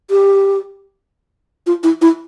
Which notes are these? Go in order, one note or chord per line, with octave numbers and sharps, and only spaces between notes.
G4
F4
E4
E4